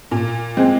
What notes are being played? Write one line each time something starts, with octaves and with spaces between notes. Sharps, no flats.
A#2
G#3 C4